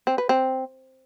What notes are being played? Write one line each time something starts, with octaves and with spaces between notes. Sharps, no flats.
C4
B4
C4